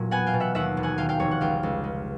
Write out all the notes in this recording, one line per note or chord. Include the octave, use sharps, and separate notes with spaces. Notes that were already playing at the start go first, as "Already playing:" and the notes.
Already playing: E1 A#2 F#3
B3 F#5 G#5
F5 G5
B2
E5 F#5
D#2 E5 F#5
E1
F#5 G#5
D#3 F5 G5
F5 G5
F1 C#5
F#5
C#2 F5 G5
C#2
G#3